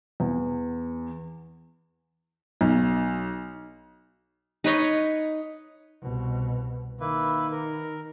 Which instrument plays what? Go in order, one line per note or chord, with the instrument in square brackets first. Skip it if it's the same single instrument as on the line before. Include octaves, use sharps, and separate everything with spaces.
[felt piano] E2
[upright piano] B1
[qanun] D#4 B4 C#5 D#5
[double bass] C2 B2
[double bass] D#3 [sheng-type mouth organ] A#3 E4 B4
[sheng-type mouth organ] A#4